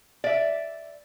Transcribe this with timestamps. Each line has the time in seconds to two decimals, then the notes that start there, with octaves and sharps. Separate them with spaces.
0.24 D5 E5